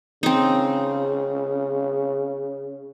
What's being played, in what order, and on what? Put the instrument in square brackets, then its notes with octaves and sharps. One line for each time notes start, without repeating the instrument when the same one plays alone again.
[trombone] C#3 [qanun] C4 D#4